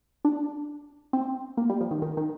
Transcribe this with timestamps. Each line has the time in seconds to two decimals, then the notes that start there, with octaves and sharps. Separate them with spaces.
0.25 D4
1.13 C4
1.57 A#3
1.70 G3
1.81 F3
1.91 D#3
2.02 D#3
2.17 D#3